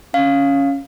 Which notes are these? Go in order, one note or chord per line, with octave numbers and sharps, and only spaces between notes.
C#4 F5